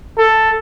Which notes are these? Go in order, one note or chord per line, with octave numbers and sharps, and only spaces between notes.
A4